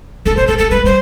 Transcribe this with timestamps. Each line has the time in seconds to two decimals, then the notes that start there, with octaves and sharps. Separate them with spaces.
0.26 D3 A4
0.36 C3 C5
0.47 D3 A4
0.58 A3 A4
0.70 G3 B4
0.84 G3 C5